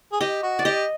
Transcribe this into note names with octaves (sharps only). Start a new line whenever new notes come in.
G#4
G4 D#5
F#4
D5
G4 D#5